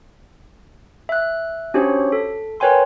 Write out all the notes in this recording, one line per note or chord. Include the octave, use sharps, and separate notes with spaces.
E5 F#6
C#4 D4 F#4 G4 C5 C#5
A4
A#4 B4 C#5 G5 G#5 C6